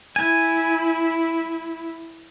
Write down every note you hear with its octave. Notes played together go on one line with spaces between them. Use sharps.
E4 G#5